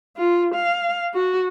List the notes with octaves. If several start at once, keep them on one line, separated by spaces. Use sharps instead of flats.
F4
F5
F#4